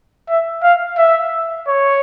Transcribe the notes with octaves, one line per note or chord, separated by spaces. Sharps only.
E5
F5
E5
C#5